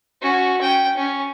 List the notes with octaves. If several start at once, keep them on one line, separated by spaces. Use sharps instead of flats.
C#4 F#4
C#4 G5
C#4